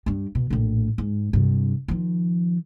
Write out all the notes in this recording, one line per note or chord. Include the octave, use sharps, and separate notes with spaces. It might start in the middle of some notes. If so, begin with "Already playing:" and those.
G2 G3
B2
A#1 A2
G#2
G2 C3
D#3 F3